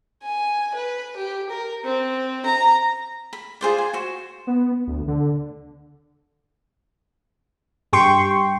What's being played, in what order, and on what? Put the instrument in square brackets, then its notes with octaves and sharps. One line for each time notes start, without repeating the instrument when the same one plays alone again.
[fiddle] G#5
B4
G4
A#4
C4
A#5
[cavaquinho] B5
F4 G#4 C5 D5
G#5
F#4 C5
[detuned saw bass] B3
D2
D3
[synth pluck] G2 G4 G5 C6 C#6